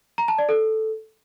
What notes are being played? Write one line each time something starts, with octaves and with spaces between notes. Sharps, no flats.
A#5
A5
D5
A4